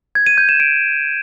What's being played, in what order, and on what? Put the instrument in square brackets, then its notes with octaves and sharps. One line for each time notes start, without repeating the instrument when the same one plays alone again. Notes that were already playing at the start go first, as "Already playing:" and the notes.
[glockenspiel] G#6
D#7
G6
E7
D7